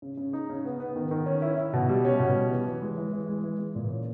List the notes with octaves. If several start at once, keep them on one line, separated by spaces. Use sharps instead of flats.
C#3
C#3
D#4
C#3
B3
B3
D#3
D#3
C#4
E4
E4
B2
G3
C#4
B2
G3
E3
E3
G#3
E3
E3
G#3
E3
E3
A#2
C#4